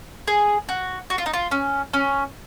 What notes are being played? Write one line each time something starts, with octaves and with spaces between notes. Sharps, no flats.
G#4
F#4
F#4
F4
D#4
F4
C#4
C#4